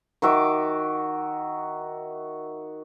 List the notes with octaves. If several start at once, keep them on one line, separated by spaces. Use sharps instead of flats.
D#3 F#4 E5 D6